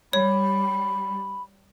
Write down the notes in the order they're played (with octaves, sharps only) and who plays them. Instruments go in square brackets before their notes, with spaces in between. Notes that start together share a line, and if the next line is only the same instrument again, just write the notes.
[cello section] G3 [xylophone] C#5 [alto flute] B5